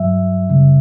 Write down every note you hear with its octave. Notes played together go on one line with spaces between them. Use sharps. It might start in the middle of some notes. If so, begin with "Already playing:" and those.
Already playing: G2 F#3 E5
F#2 C#3 G3